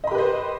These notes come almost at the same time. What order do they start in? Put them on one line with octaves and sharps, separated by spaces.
D#5 B5 G4 B4 C5